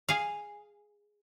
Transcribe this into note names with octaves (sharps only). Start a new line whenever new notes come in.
G#4 F5